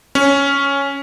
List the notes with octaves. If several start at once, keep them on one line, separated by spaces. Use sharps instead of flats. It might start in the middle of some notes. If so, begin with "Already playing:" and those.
C#4